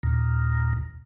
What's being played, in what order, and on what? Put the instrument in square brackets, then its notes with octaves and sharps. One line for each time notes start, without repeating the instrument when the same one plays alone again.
[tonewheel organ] D#2 A#2